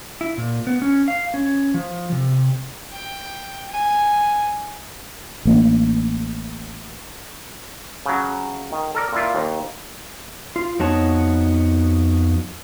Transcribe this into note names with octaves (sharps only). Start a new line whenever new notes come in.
E4
A#2
B3
C#4
F5
C#4
F3
C3
G5
G#5
A1 A#3 D4
C#3 F#3
D#3
A4 A#4 D5
A#2 E4 F4
D#2
F4
F2 B3 D#4 F#4 C#5 A5